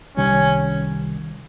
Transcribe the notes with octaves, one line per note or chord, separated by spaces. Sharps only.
C2 C3 D#3 G3 C#4